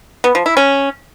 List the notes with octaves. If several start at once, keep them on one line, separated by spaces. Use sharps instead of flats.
B3
F3
E4
C#4